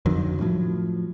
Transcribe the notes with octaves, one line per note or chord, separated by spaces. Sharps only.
F2 D3 D#3 F#3
A2 F3 F#3